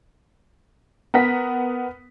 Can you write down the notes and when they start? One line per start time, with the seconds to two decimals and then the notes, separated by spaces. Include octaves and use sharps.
1.14 B3 A#4 F#5 B6